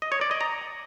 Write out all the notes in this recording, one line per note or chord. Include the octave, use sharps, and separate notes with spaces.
D#5
C#5
D5
D#5
A#5